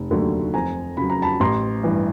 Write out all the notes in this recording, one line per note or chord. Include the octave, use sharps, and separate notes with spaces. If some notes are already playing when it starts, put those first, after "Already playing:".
Already playing: F1
D#2 D3 F#3 A3
F2 G#5 A#5
C#3 F#3 B5
A#5
A5 B5
A1 A#5 C6
G2 E3